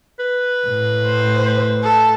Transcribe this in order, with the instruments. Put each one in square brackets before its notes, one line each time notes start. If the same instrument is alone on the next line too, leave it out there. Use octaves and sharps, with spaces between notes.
[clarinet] B4
[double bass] A2
[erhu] C5
A4